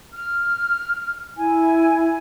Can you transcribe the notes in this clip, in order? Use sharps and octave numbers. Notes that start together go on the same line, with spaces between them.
F6
E4 G#5